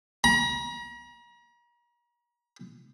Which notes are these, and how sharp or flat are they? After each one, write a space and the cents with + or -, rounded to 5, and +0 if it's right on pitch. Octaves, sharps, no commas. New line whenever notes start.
A#5 +40